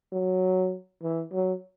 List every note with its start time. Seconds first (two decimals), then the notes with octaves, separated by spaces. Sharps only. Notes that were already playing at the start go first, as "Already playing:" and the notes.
0.12 F#3
1.03 E3
1.32 F#3